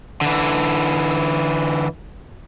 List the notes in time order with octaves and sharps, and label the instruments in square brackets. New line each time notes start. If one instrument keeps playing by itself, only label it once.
[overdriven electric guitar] D3 E3